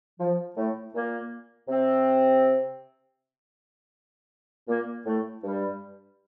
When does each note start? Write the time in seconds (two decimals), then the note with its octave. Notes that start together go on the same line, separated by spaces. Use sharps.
0.18 F3
0.55 A2 A3
0.93 A#2 A#3
1.68 C3 C4
4.67 A#2 A#3
5.04 A2 A3
5.42 G2 G3